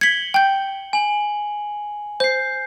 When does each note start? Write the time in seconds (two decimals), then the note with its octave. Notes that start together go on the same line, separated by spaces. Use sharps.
0.01 G#6 B6 C#7 F#7 G7
0.34 G5 G6
0.93 G#5 F#7
2.20 C5 G6 C7